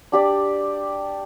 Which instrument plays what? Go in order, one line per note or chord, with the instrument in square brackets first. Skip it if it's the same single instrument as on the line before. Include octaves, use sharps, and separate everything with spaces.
[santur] D4 G4 D5